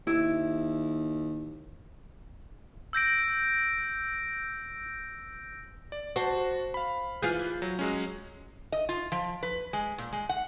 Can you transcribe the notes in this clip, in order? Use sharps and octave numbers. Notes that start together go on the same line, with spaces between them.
D#2 E4
E6 G6 A#6 D7
D5
F#4 C5 A5
F5 B5
E3 F4 G#4 B4 G6
F#3
F#3 G#3 C#4
D#5
F4
F3
B4
G#3
A#2
G#3
F#5